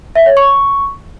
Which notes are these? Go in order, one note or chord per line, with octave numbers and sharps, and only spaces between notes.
E5
C#5
C#6